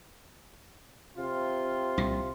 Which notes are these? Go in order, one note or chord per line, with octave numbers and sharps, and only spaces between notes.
C3 F4
C2 A#2